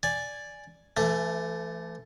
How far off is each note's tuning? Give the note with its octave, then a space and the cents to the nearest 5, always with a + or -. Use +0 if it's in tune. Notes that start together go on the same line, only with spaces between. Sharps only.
D5 +0 G#5 +0
E3 +35 A3 +0